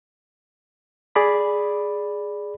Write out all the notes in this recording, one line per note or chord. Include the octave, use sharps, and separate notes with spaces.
G#4 D5 B5